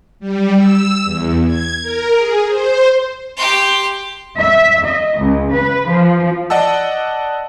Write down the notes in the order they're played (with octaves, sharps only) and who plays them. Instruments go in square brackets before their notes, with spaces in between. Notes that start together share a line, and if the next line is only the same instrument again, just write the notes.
[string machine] G3
E6
E2
G#6
A#4
G#4
C5
[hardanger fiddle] G4 C6
[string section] E5
D#5
C#2
B4
F3
[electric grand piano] D5 D#5 F#5 A5 E6